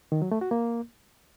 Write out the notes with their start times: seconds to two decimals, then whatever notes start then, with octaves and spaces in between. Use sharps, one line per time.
0.12 D#3
0.22 F#3
0.32 A3
0.41 F#4
0.51 A#3